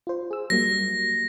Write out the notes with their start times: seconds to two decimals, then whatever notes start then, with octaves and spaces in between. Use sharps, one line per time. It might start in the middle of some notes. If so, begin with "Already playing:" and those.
0.07 F4 C5
0.31 G#4 E6
0.50 F#3 G3 A#3 A#6